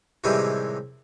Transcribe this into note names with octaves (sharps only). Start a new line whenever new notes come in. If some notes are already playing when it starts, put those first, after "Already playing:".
A2 C3 D#3 E3 G3 G#3